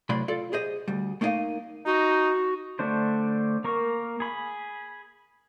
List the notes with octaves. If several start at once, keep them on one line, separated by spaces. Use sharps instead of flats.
A2 C3 F#3 D5 B5 C6
F4 A4 D5
G4 G#4 C5 D#5
D2 G3
A3 A#3 D#4 G4 D#5 F5
D#4 F#4
D3 A3 D4 C5
A#3 A#4 C#6
G#4 B5